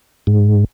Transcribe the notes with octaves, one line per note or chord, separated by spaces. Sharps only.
G#2